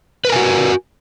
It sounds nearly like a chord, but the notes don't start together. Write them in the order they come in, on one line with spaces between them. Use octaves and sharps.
B4 A#4 G#5 F#4